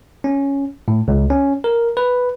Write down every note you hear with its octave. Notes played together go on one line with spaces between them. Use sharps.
C#4
A2
C#2
C#4
A#4
B4